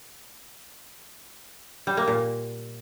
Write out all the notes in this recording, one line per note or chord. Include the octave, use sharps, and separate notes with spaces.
G3
A#3
A#2